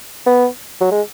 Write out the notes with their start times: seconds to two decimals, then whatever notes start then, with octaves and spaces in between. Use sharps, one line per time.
0.27 B3
0.81 F#3
0.92 G#3